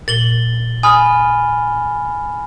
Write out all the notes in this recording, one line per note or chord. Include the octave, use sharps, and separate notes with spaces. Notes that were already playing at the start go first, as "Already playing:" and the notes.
A#2 A6 F#7 G7
G#5 B5 D#6 F6